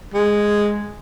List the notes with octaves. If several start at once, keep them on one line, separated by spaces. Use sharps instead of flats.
G#3